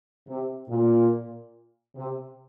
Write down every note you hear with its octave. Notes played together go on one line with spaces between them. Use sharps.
C3
A#2
C3